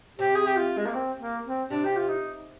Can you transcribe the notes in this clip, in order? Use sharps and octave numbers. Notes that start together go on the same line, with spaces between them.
C3 G4
G#4
G4
F4
G#3
A#3
C4
A#3
C4
C3 D4
G4
F4
D#4